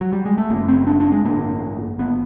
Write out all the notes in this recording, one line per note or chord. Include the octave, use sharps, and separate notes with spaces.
F#3
G3
G#3
A3
F#1 F#2 C#3 A#3
C4
D4
D4
G#3
A1 G2 D3 A#3
G#1 B3